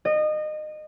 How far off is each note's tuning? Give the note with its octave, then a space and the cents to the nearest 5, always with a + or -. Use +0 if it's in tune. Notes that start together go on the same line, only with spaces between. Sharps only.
D#5 -25